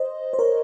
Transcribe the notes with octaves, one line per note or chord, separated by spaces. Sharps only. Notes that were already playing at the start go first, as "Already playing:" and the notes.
Already playing: C5 D#5
C5
A#4 C#5